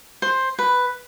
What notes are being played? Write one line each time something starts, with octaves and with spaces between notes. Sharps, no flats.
C5
B4